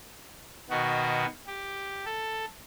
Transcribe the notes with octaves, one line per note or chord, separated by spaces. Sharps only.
B2 D#3 B3 F#4
G4
A4